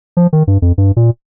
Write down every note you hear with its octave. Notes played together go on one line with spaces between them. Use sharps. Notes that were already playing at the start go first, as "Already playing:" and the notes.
F3
D#3
G2
F2
G2
A#2